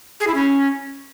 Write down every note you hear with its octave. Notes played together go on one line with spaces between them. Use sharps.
G#4
E4
C#4